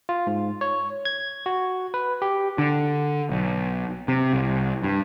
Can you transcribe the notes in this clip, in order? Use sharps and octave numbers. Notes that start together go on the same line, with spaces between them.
F4
G#2
C#5
G#6
F#4
B4
G4
D3
B1
C3
C2
G2